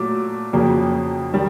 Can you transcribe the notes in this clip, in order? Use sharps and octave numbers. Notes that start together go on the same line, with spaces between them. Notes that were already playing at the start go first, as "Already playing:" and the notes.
Already playing: A#2 F#3 A3 D6
F2 C#3 F#3 A#3
D#3 G3